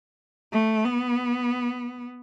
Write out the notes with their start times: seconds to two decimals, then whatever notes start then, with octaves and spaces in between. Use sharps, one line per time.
0.52 A3
0.85 B3